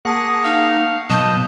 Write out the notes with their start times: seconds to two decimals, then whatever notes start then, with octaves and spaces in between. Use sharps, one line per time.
0.05 A#3 G#4 F#5 A5 C#6 D#6
0.44 D#4 F5
1.10 B2 F#3 D#5 A5 G6